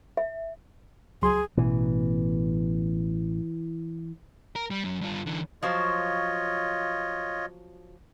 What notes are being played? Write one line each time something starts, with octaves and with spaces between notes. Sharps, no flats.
E5
C#2 F#3 G#4 C6
A1 B2 E3 B3
A#4
G3
F#2 F#3
G2 F4
D3 E3
F3 F#3 F4 C5 C#5 D#5